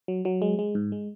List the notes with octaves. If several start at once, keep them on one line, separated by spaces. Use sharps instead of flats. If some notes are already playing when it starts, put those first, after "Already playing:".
F#3
F#3
G#3
G#3
G#2
G#3